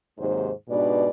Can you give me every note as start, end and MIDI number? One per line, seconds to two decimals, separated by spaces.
0.18 0.50 39
0.18 0.50 44
0.18 0.50 48
0.18 0.50 54
0.18 0.50 72
0.69 1.10 44
0.69 1.10 47
0.69 1.10 62
0.69 1.10 67
0.69 1.10 71
0.69 1.10 74